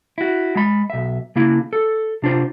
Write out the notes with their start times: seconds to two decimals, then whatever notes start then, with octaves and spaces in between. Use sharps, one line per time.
0.18 E4 F#4
0.56 G#3 B5
0.90 B1 E5
1.36 C#3 A#3 E4
1.73 A4
2.22 C3 D4 F4 C5